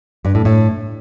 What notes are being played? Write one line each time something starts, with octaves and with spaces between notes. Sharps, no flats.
G2
A2
A2